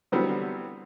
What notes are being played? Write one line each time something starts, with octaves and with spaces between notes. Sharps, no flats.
D3 E3 F#3 G3 B3 C4